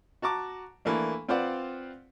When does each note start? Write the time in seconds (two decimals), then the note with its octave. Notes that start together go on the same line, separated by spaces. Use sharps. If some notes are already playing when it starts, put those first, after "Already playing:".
0.22 F#4 A5 A#5 D6
0.85 E3 A3 A#3 D4
1.29 C4 F4 B4 C5 D5 F#5